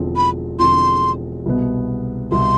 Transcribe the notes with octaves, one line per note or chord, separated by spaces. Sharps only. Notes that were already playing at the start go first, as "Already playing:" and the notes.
Already playing: E1 E2 D3 F3 C4
B5
E1 E2 D3 F3 C4 C6
C2 B2 B3
C2 B2 B3 C6